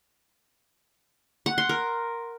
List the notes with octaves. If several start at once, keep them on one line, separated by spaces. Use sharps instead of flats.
F#5
C6
A#4